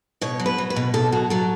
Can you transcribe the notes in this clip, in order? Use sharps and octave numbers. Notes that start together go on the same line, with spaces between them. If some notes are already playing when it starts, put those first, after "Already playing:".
B2 C#5
F#3
B4
F#3
B4
B2
B2 A4
F#3 F#4
F#3 A4